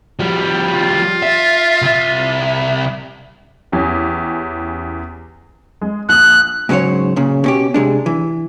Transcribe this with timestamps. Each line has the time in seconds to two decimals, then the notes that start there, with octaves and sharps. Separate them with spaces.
0.19 F3 G3
0.73 F4
1.23 E5
1.82 C2 E5
3.72 E2 C#4 G4
5.81 G#3
6.09 A#1 D#6 F#6
6.69 G#2 C#3 F#3 C5 C#5
7.16 A#2 C#3
7.44 B2 C#4 G4
7.74 C3 G#3 D4
8.06 E3